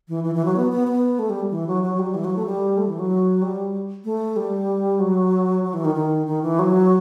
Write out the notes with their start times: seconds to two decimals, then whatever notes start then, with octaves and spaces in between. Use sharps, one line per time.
0.08 E3
0.24 E3
0.35 E3
0.45 F#3
0.56 B3
0.72 B3
0.88 B3
1.19 A3
1.30 G3
1.51 E3
1.67 F#3
1.83 F#3
1.99 G3
2.14 E3
2.24 F#3
2.36 A3
2.46 G3
2.78 A3
2.88 E3
2.99 F#3
3.42 G3
4.04 A3
4.36 G3
5.00 F#3
5.63 F#3
5.74 E3
5.85 D#3
5.95 D#3
6.27 D#3
6.42 E3
6.59 F#3